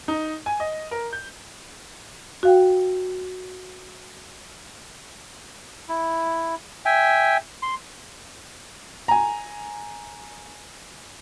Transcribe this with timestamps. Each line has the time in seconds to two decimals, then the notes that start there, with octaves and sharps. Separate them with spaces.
0.08 D#4
0.46 G#5
0.60 D#5
0.91 A#4
1.13 G6
2.43 F#4 F5 G5
5.89 E4
6.85 E5 G5 G#5
7.63 C6
9.08 G#5 A#5